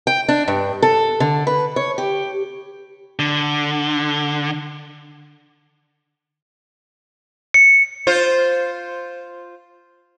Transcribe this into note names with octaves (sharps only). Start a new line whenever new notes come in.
G5
D4
G2
A4
D3
B4
C#5
G4
D3
C#7
F4 C5